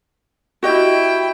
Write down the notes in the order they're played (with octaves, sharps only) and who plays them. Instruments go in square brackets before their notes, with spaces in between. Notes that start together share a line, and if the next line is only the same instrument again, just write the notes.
[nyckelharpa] E4 G5 [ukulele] F#4 G4 D#5